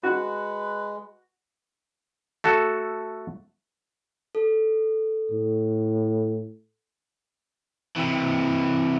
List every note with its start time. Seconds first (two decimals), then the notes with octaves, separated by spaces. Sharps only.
0.03 G#3 F#4 B4
2.44 A3 F#4 A4
4.35 A4
5.31 A2
7.96 C3 E3